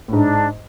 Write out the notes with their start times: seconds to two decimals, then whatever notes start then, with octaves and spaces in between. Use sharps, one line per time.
0.08 A2
0.12 G#2 D4